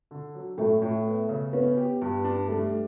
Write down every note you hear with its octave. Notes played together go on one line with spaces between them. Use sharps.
D3
F#3
A2 A3 A4
A2
B3
C#3
B3 C#4 B4
G4
G2
D4
G3 A3 A4